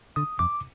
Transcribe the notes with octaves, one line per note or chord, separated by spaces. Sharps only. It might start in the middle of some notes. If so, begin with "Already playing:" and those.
D3 D#6
F2 D6